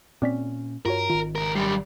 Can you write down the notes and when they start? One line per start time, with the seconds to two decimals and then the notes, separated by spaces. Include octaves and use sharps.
0.22 A#2 C4 C#4 D5 B6
0.86 G2 F4 F#4 A#4 C#5
1.10 G#1 D#3 F4
1.36 C#2 A#4
1.56 F#2 G3 C7